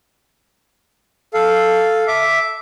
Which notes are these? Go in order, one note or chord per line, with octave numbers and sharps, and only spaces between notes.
A4 F5
E5 D6